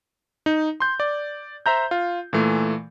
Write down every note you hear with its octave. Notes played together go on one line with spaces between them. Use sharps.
D#4
C6 G6
D5
C5 E5 A#5 G6
F4
A#2 E3 A3